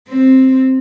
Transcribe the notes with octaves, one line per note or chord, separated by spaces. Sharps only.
C4